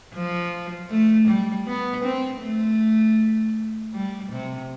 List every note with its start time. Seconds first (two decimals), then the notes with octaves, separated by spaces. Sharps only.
0.14 F3
0.90 A3
1.28 G3
1.67 B3
2.04 C4
2.42 A3
3.94 G3
4.32 C3